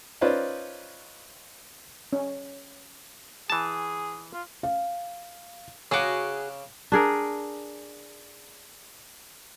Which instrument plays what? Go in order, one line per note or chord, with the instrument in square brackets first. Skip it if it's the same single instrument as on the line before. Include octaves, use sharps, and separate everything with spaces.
[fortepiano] C#4 D#4 F4 B4 C5 D5
[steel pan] C#4
[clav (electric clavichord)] E3 A5 [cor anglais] G#4
[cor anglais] F4
[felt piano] F5
[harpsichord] C#3 D6 [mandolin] F#4 G#4
[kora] D4 G#4 A#4